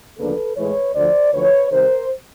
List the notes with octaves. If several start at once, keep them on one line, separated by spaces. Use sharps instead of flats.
D2 C#3 F3 A#3 D4 A4 B4
A2 E3 G#3 B4 C#5
D2 D3 F3 C5 D5
D2 D3 F3 B4 C#5
C3 D#3 G3 A#4 C5